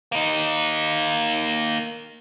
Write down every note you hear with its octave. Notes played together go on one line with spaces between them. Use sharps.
A#3 D#4